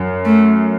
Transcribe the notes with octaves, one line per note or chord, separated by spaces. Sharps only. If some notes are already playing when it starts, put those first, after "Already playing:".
Already playing: F#2
A3